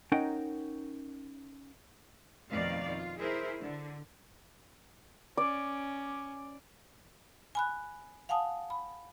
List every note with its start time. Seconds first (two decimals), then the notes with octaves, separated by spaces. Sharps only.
0.12 C#4 D#4 A#4 F#5 G5
2.52 F2 B2 D#3 A3 D5 F5
2.90 F4
3.19 E4 G#4 A#4 C5
3.61 D3
5.37 C#4 D5
7.55 G#5 B5 F#6
8.29 F5 F#5 G#5 A5 D#6
8.70 B5